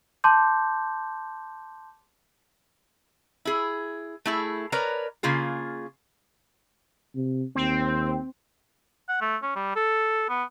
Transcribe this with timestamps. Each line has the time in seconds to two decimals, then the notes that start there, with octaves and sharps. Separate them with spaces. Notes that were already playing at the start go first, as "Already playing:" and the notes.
0.24 A5 C6 D6 G6
3.45 E4 G#4
4.25 A3 E4 G#4
4.72 A#4 B4 C#5 D5 A#5
5.23 C#3 A#3 F4 G#4
7.15 C3
7.55 D#2 C4
9.09 F#5
9.21 A3
9.42 C#4
9.56 G3
9.76 A4
10.29 B3